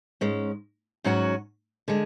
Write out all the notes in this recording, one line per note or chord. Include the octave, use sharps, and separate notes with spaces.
G#2 G#3 C#4
G#2 F#3 C#4 F#4
D3 G#3